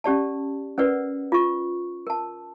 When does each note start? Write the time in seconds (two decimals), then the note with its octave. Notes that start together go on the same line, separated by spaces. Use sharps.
0.04 C#4 G4 D5 A5
0.78 C#4 A#4 B4 D5 F#5
1.32 F4 C#6
2.07 A#4 A5